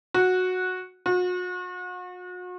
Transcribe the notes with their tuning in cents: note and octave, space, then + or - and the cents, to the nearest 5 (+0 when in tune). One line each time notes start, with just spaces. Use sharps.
F#4 -10
F#4 -40